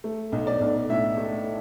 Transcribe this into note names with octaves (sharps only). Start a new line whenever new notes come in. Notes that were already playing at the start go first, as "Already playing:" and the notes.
A3
B1
D5
B1
A2 E5
A3